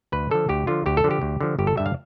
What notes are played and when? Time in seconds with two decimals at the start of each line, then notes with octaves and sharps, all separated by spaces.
0.12 D2 B4
0.31 D3 F3 A4
0.49 D2 G4
0.67 D3 F3 F4
0.86 D2 G4
0.97 A4
1.04 D3 F3
1.11 G4
1.22 D2
1.41 D3 F3
1.59 G1 G4
1.67 A4
1.77 G2 D3 G3 E5
1.86 F5